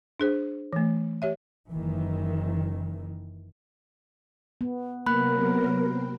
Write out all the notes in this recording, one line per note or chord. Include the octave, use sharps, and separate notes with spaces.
D4 G#4 C5
E3 A3
G4 C#5 E5
F#1 D#3 E3
B3
C3 F#3 A#3 B3 A#4 B5 F#6
B3
C4